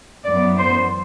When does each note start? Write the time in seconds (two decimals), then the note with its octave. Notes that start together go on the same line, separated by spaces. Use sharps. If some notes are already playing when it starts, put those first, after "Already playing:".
0.25 F#2 E3 B3 D5
0.57 C5